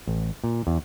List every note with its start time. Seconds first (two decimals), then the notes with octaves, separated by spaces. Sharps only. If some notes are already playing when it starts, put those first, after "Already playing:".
0.08 A1
0.44 A#2
0.67 E2